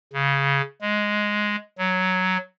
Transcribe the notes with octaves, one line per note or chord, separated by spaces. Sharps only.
C#3
G#3
F#3